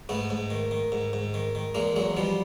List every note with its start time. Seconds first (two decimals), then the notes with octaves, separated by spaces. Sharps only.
0.09 G#2 A3 B3
0.30 G#2
0.50 D#3
0.71 D#3
0.92 G#2
1.13 G#2
1.34 D#3
1.55 D#3
1.75 E2 G#3 A#3
1.96 E2 F#3 G#3
2.17 B2 F3 G3